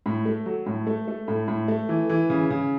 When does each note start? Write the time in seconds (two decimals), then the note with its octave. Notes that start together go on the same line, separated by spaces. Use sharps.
0.06 A2
0.26 A3
0.46 F#3
0.66 A2
0.87 A3
1.08 A3
1.28 A2
1.48 A2
1.68 A3
1.89 E3
2.09 E3
2.30 C#3
2.50 C#3